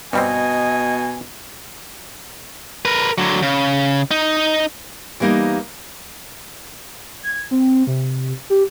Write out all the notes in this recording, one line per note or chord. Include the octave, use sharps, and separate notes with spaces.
G2 B2 G3 C4 D#5 G#5
A#4 B4
D3 F#3
C#3
D#4
E3 G3 A#3 B3 D#4
G#6
C4
C3
G4